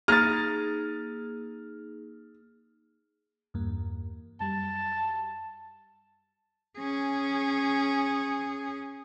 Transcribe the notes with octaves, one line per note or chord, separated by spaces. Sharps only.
A#3 D#4 G#4 F6 A6
E2 G2 A#3
F#2 G3 A5
C#4 G#4